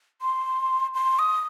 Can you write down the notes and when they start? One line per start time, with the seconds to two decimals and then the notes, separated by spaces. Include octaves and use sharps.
0.22 C6
0.94 C6
1.19 D#6